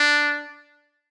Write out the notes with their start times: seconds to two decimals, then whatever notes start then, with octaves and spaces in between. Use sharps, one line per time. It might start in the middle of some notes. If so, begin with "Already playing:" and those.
Already playing: D4